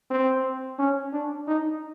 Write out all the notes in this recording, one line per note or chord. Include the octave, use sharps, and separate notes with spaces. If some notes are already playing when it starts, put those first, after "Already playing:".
C4
C#4
D4
D#4